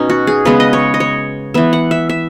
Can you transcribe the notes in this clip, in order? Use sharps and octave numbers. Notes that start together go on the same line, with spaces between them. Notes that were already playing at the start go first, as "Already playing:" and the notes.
Already playing: B2 C#4 D#4
F#4
G#4
C#3 G#3 B3 B4
D#5
C#5
D#5
C#5
E3 B3 E5
F#5
E5
E5